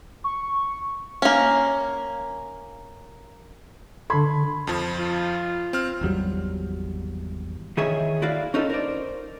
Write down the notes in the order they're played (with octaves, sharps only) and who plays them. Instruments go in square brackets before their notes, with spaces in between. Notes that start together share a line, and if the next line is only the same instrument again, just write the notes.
[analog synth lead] C#6
[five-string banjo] A#3 C#4
[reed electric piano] D3 A4 [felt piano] B5 C6 G#6
[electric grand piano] F2 F3
[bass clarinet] F4
[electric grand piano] C4 F6
[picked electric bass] G#1 E2 F#3 G3
[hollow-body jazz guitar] D#3 E3 G#4 C#5 E5
E4 F#4 D5 F5
C#4 D#4 F4 A4
A#4 C5 D5